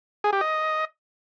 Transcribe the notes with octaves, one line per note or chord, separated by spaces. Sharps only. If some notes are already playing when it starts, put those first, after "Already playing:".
G#4
G4
D#5